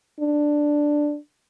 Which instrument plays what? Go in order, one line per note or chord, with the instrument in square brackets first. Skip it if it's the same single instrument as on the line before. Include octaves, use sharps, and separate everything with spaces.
[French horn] D4